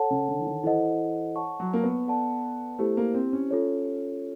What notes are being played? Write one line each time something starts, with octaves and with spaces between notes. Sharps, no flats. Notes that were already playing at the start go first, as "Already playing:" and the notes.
Already playing: A4 C#5 F#5 A5
C#3
D3
E3
D#3
E3 E4 A4 C5 D#5 F#5
C#5 F#5 A5 C#6
F#3
A#3
B3
A4 D5 F#5 A5
A3 E4 G4 C5
A#3
C4
C#4
F4 A4 C#5